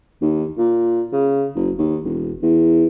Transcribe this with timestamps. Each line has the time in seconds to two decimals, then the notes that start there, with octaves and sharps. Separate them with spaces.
0.22 D#2
0.58 A#2
1.13 C#3
1.56 F#1
1.79 D#2
2.04 E1
2.43 E2